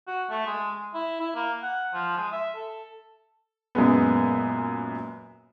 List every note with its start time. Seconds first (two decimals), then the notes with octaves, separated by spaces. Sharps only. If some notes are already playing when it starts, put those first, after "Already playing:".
0.08 F#4
0.30 A3
0.46 G#3
0.72 G#3
0.94 E4
1.20 E4
1.35 A#3
1.63 F#5
1.94 F3
2.17 G#3
2.32 E5
2.56 A4
3.75 F#2 A#2 G#3 B3